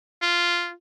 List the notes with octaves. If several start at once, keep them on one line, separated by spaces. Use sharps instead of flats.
F4